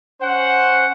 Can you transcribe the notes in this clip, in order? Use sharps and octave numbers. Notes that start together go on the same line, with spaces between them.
C#4 C5 F#5